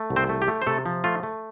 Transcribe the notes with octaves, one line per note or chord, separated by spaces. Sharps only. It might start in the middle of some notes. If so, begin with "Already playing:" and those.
Already playing: A3
C2
C4 C5
A3
G4
A3
C5
C3 A3 A4
F3
A3 F4
A3